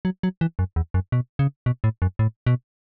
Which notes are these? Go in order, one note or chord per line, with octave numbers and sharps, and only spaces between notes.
F#3
F#3
E3
F#2
E2
F#2
B2
C#3
B2
A2
F#2
A2
B2